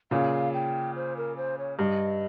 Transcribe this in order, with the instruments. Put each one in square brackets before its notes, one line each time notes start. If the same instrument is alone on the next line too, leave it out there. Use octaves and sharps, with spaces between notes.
[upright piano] A#2 C#3 [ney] F5
[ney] G5
C5
A#4
C5
C#5
[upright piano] G2 [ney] D#5